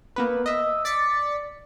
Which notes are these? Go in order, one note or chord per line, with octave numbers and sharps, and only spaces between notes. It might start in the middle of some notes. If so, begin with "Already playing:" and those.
A#3 B3 B4
D#5 E5
D5 A6 B6 C#7